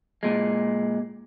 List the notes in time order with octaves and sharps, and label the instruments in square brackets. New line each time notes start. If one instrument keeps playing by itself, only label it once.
[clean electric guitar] A#2 G#3